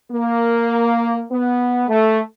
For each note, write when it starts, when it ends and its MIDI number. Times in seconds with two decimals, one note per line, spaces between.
0.11 1.23 58
1.31 1.86 59
1.88 2.19 57